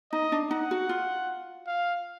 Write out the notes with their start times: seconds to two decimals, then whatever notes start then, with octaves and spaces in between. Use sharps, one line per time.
0.12 D#4 D#5
0.32 D4
0.51 D#4 F#5
0.71 F#4
0.89 F4
1.67 F5